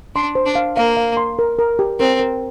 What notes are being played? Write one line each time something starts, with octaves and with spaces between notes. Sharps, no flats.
D4 C6
C5
D4
F5
A#3 F5
F5
C6
A#4
A#4
G4
C4 A#4
A#4